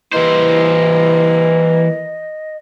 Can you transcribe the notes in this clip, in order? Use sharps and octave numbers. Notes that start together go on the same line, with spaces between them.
E3 G3 A#3 E4 B4 C5 D#5